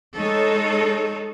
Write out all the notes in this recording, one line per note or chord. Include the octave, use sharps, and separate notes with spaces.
G#3 D#4 A4 C#5